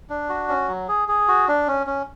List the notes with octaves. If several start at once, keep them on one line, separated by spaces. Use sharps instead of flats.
D4
F#4
C#4
F#3
G#4
G#4
F#4
D4
C#4
C#4